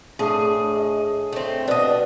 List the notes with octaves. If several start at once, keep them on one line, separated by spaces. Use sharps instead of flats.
A2 D4 G#4 F5
D#5
A3 C4
B2 D4 D#5 F5 F#5